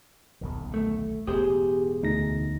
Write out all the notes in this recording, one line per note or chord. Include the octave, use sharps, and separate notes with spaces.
D#1 B1 D3
A3
E1 A2 B3 G4 G#4 C5
D2 D#4 A#6